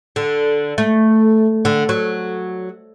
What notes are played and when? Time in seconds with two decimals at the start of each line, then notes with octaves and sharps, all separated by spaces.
0.16 D3
0.78 A3
1.65 D3
1.89 F#3